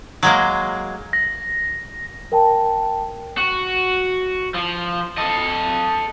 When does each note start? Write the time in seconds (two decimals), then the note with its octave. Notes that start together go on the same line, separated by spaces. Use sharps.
0.23 F#3 G#3 A#3
1.13 A#6
2.32 A#4 G5 A5
3.38 F#4
4.55 F3
5.18 A4 D#5